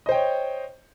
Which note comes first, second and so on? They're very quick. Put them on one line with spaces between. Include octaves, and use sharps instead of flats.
D#5 C5 G5 C#5